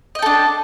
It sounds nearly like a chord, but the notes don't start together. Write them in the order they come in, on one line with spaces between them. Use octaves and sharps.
D#5 G5 A4 D4